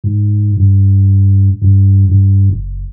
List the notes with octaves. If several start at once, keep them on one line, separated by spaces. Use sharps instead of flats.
G#2
G2
G2
G2
F#1